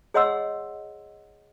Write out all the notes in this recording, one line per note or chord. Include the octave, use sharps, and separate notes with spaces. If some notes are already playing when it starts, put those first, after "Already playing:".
G#4 C#5 D#5 F#5 C6 E6